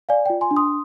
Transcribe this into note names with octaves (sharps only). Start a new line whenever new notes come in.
D5 F5 G#5
G5
F4
G#5 C6
D4
C6 D#6